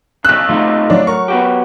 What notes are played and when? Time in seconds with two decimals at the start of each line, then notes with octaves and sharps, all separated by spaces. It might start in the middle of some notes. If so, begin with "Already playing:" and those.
0.25 B1 C#3 E6 F#6
0.49 C3 A3 D#4 F4
0.90 F#3 D4 F#6
1.07 A#4 C#6
1.28 B3 F#4 G4